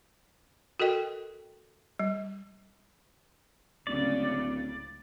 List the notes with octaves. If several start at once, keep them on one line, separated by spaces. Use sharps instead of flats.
F#4 A4 A#4 D#5 G5
G3
D1 C#2 A2 C#3 D5